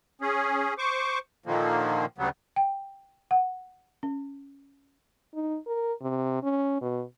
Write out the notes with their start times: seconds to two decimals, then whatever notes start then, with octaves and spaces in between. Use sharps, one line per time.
0.21 C#4 G#4
0.78 C5 C#6 D6
1.46 A#2 D3 D#3 F3 A#3
2.18 D2 C#3 F#3 G3 B3
2.56 G5
3.31 F#5
4.03 C#4
5.34 D#4
5.67 A#4
6.02 C3
6.43 C#4
6.82 B2